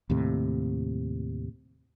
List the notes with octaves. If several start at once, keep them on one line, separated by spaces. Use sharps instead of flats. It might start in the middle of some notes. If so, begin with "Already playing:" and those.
D#2 A2 C3